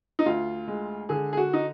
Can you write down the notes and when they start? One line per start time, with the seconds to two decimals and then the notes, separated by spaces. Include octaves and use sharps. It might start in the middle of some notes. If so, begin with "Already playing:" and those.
0.19 D#4
0.26 D2 F4
0.68 G#3
1.09 D3 G#4
1.33 G#4
1.37 F#4
1.53 D#4